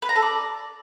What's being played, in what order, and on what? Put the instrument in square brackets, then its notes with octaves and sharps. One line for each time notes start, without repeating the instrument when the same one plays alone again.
[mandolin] B4
A#5
A4
D5